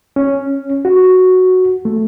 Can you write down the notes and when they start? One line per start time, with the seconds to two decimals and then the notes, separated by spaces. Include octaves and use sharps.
0.16 C#4
0.85 F#4
1.85 A3